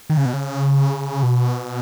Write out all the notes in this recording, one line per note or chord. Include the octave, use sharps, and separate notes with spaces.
D#3
C#3
B2
C#3
B2